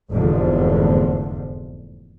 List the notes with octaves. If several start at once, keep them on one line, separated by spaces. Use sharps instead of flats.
F1 E2 G#2 D3 F3